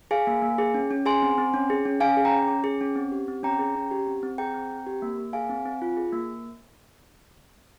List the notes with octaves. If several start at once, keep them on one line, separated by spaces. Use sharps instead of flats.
G#4 F5 G#5
A#3
A#3
G#4
C#4
C#4
G#4 G#5 C6
C4
C4
C#4
G#4
C#4
C#4 F5 G#5
G#4
G5 A#5
C#4
C#4
G#4
C#4
C4
G4
C4
C#4 G5 A#5
G#4
C#4
G4
C4
C4
G#4 G5 A#5
C4
C4
G4
A#3
A#3
G#4 F5 G#5
C4
C4
F4
G#4
A#3